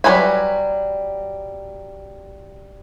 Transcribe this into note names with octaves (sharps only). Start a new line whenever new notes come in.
F#3 G3 A4 B4 G#5